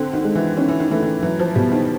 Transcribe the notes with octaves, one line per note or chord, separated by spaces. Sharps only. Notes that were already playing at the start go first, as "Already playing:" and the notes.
Already playing: D3 C4
D#3
G#3
E3
D#3 C#4
E3
D#3
E3 A3
D#3
E3 F#3
F3
B2 G3
D#3